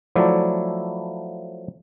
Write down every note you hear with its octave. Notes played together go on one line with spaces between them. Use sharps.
F3 F#3 A3 E4 D5